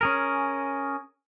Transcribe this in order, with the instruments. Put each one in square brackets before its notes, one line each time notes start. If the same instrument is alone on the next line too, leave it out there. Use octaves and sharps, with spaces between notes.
[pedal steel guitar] C#4 G#4 A#4